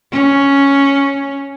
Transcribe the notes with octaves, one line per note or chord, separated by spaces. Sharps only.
C#4